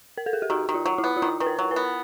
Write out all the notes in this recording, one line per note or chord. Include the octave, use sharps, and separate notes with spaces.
A#4
A4
G#4
G4
D#3 F#4
D#3
F4
F#3
E4
B3
F4
D#3 E4
D#3 B4
A#4
F#3
B4
B3